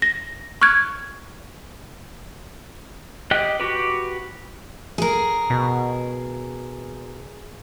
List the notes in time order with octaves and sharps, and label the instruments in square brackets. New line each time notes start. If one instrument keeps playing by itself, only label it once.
[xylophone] A#6
C#6 F6 F#6 G#6
[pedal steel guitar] G4 D#5 G5 F#6
F#4 G4 B4
[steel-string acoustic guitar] G#4 A#4
[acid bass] B2